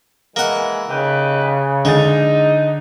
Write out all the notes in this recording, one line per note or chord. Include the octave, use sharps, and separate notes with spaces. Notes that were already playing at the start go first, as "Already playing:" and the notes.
E3 G#3 A#3 F#5
C#3 D#4 G4 B4
D3 G#3 D#4 D5 A6